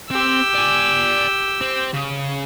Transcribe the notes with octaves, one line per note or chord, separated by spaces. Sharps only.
C4 G4 E6
D5 G#5
C4
C#3